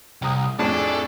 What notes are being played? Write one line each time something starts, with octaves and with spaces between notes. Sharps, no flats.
C2 G5 A#5 D#6
F2 A2 D4 G#4 A4 D5